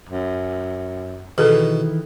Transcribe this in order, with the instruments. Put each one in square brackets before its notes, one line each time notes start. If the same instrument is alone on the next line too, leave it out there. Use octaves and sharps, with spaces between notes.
[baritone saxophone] F#2
[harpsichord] B2 [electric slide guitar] D#3 E3 [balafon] G#4 A4